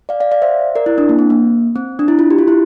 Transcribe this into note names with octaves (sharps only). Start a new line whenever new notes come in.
D5 F5
D5 F5
D5 F5
C5 E5
A#4 D5
E4
D4
A#3
C4
A#3
C4
D4
E4
F4
G4
F4
E4